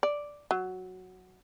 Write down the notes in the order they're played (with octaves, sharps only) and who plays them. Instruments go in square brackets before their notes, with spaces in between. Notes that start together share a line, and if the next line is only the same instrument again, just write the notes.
[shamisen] D5
F#3